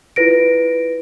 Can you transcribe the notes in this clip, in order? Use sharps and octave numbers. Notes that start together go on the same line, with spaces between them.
E4 F4 B4 A#6 D7